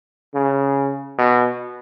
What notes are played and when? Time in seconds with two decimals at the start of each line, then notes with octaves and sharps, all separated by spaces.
0.34 C#3
1.19 B2